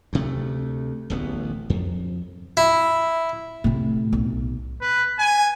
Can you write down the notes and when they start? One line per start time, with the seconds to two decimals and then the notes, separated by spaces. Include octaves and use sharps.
0.13 D2 C3 A3
1.10 D1 A1 B3
1.70 F2
2.57 E4
3.64 A2 C3
4.13 B1
4.81 B4
5.19 G#5